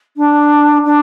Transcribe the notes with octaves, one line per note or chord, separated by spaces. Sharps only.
D4
D4